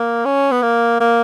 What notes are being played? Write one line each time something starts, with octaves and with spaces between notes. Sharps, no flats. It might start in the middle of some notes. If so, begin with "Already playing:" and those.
Already playing: A#3
C#4
B3
A#3
A#3